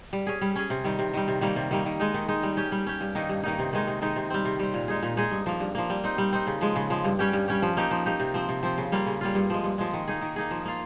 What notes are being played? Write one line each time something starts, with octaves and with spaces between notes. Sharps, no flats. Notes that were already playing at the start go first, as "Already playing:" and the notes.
G3
C#4 G#4
G3
C#4 G#4
C3
D#3 G3
C3
D#3 G3
C3
D#3 G3 A#3
C3
D#3 G3 A#3
D#3
G#3 D#4
D#3
G#3 D#4
G3
C#4 G4
G3
C#4 G4
G2
D#3 A#3 D#4
G2
D#3 A#3 D#4
C3
D#3 G#3 D#4
C3
D#3 G#3 D#4
C3
G3 C4
C3
G3 C4
A#2
G#3 D#4 G#4
A#2
G#3 D#4 G#4
G2
F3 A#3
G2
F3 A#3
G3
C4 D#4
G3
C4 D#4
C#3
F3 G#3
C#3
F3 G#3
G2
G3 C#4 G4
G2
G3 C#4 G4
F3
A#3 D#4 G4
F3
A#3 D#4 G4
C3
F3 C4
C3
F3 C4
C#3
G3 A#3 F4
C#3
G3 A#3 F4
G2
F3 G#3
G2
F3 G#3
D#3
A#3 D#4 G#4
D#3
A#3 D#4 G#4
F3
A#3 F4